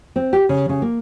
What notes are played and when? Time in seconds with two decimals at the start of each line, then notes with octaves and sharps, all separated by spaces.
0.16 C4
0.33 G4
0.49 C#3
0.69 C#3
0.82 A#3